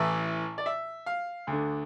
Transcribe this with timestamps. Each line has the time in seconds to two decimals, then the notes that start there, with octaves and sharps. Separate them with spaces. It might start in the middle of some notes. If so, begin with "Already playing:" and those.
Already playing: A1 A2 E3 E5
0.58 D5
0.66 E5
1.06 F5
1.47 D2
1.52 D3